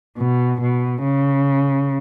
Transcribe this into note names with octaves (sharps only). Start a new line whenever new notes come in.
B2
B2
C#3